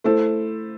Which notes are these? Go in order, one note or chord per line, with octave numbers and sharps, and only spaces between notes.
A3 E4 A4 C5